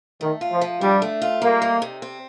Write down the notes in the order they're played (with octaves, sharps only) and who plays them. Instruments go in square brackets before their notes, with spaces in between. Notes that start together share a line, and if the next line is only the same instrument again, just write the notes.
[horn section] D#3 [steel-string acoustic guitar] A3
[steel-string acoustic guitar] F4
[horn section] F3
[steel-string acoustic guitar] F3
[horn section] G3 [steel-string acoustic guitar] D4
[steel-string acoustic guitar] A3
F4
[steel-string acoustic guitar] G3 [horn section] A#3
[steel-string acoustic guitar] D#4
C3
C4